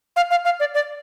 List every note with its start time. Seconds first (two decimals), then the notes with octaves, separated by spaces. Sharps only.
0.16 F5
0.31 F5
0.45 F5
0.60 D5
0.75 D5